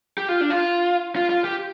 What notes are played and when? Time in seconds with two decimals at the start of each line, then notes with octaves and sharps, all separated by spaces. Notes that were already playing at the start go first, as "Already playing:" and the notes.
0.18 G4
0.29 F4
0.41 D4
0.50 F4
1.16 F4
1.30 F4
1.44 G4